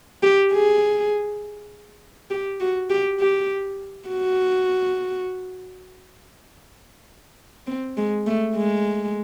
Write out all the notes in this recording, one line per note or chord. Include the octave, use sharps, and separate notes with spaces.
G4
G#4
G4
F#4
G4
G4
F#4
C4
G#3
A3
G#3